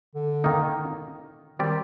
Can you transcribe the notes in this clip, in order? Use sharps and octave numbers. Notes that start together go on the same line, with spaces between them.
D3
D#3 A#3 D#4
D#3 G3 C4 G4 D5